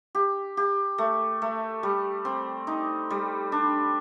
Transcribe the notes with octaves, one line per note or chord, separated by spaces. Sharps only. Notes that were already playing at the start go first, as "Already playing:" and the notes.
G4
G4
A3
A3
G3
C4
D#4
G3
D4